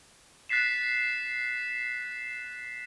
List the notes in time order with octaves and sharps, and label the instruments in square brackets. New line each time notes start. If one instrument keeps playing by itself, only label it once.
[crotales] F#6 A6 B6 C7 E7